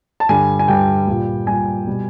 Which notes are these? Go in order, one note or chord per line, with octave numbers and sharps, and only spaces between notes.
A5
G2 D3 G3 G#5
G#5
G2 D3 G3 G5
A#2 G3
A#2 G3 G#5
B2 G3